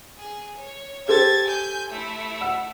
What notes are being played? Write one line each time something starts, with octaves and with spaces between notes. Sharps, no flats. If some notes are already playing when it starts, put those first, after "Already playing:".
G#4
C#5
G4 A4 C5 G#6 A6
G#5 G6
A3 E4
F#5 E6